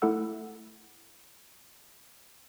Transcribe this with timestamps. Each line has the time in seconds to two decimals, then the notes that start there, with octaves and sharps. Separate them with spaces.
0.02 A3 E4 A4 F#5 E6